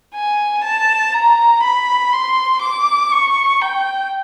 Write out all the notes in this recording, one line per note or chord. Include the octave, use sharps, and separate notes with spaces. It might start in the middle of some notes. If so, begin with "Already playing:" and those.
G#5
A5
A#5
B5
C6
D6
C#6
G5